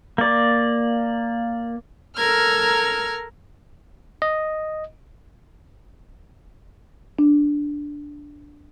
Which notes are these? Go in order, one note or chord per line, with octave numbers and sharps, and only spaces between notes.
A#3 D5
A4 A#4 A#5 E6 F6 G#6
D#5
D4